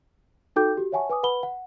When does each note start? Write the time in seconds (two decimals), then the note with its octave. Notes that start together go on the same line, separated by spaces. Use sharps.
0.56 D#4 F#4 A4 G5 D6 G6
0.77 F#4 G4
0.92 C#5 E5 F#5 G#5 A5 C#6
1.10 B4 G#5 D6 D#6
1.23 B4 F#5 B5 G7
1.43 F#5